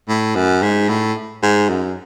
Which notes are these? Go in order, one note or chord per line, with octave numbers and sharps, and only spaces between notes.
A2
F#2
G#2
A2
G#2
F#2